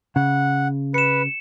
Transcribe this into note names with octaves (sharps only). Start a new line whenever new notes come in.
C#3 F#5
B4 C#7 E7